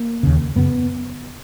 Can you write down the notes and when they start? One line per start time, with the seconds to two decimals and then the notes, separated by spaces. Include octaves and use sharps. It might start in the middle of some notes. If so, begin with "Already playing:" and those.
Already playing: A#3
0.23 D#2 C#3
0.56 F#2 C#3 B3